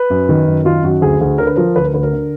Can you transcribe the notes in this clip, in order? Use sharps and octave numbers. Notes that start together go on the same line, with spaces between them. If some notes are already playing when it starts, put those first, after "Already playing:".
Already playing: B4
F#2
D#3
F#2
D#3 F4
F#2 F#4
D2 G#4
D2 G#4
D3 A#4
B4
F3 A#4
D2 B4
A#4
D2 B4
A#4
D3